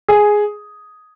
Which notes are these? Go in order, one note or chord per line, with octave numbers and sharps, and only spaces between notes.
G#4